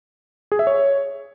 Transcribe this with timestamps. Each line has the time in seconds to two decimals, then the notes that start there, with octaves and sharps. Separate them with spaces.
0.52 G#4
0.59 E5
0.67 C#5